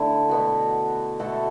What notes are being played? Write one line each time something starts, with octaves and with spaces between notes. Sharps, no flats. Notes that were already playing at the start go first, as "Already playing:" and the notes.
Already playing: D3 A3 E4
B2 B3 F#4
B2 A3 F#4 A4